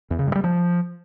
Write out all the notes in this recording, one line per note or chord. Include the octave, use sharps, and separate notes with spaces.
E2
C#3
G2
G3
F3